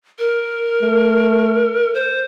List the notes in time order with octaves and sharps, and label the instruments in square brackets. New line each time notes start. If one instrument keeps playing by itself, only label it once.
[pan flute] A#4
[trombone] A3
[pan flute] C5